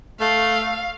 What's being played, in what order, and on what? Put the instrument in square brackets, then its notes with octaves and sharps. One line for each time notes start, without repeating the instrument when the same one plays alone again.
[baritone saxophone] A3 [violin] F5